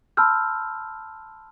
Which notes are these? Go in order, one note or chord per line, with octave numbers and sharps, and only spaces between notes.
A5 B5 C6 E6 F6 G6